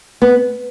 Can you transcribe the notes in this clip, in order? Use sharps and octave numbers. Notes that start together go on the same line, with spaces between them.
B3